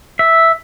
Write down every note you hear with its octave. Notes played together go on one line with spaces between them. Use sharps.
E5